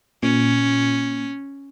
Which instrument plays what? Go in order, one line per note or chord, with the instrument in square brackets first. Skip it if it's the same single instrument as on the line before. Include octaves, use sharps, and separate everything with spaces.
[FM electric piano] A#2 [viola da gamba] C#4